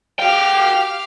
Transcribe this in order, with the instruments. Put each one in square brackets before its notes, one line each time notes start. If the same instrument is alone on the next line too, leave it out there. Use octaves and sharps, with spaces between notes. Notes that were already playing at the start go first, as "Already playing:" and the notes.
[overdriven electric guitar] F#4 G5 [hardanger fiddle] G4 F5